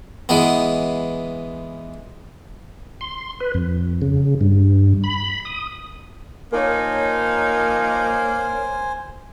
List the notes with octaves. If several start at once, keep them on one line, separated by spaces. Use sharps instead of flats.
E3 G#3 B3
C6
B4
F2
C#3
G2
B5
D#6
F3 A#3 D#4 A#4 C5 C#5 G#5